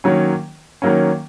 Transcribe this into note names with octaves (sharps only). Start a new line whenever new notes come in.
D#3 F#3 A#3 C#4
D#3 F#3 A#3 C#4